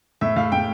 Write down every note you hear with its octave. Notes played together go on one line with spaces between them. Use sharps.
A2 E5
A2 F5
A2 G5